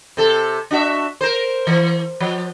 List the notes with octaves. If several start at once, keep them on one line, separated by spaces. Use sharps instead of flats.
C3 A4
D4 F#4 E5
A#4 C5
E3
F3